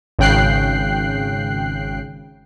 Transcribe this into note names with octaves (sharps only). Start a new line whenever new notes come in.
G#1 C#3 G5 F#6 C7